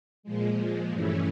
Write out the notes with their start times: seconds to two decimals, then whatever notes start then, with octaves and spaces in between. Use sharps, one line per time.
0.23 A#2 F3 G#3
0.90 G2 E3 A3 C#4